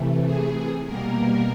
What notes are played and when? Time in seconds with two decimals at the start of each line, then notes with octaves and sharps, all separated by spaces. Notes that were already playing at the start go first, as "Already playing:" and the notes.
Already playing: C3 E3 A3
0.25 G#4
0.86 B2 G3 A#3 A#4